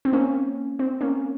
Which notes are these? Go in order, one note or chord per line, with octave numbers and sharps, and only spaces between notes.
C4
A#3 C#4
C4
A#3 C#4